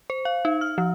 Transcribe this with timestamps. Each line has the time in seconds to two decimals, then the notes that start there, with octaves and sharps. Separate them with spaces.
0.10 C5
0.25 F5
0.45 D#4
0.61 F6
0.78 F3